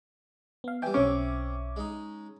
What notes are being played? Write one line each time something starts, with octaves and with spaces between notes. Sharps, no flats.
B3 F5
E3 G3 E5 G5 G#5
B1 C4 C#4 E5 D6
G#3 D#4